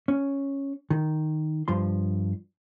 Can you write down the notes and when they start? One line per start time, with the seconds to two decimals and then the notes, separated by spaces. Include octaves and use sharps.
0.08 C#4
0.90 D#3
1.68 G2 F3 C6